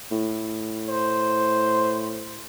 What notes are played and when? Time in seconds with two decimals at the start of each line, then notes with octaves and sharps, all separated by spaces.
0.12 A2
0.89 C5